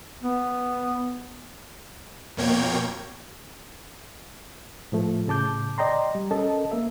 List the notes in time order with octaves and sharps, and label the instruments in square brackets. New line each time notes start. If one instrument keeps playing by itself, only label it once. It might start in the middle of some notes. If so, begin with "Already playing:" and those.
[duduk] B3
[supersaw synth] F2 B2 A#3 C#5 G5 G#6
[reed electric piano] A2 F3 A3
A2 C#3 A5 D6 G6
D5 D#5 G5 A#5 C6
G3
C#4 A4 A#4 D#5 A5
A#3 E5